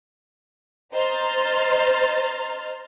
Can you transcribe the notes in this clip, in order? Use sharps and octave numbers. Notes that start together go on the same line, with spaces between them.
C5 D#5 A#5 C6 F6 A6